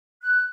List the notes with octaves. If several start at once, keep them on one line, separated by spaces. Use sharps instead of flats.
F#6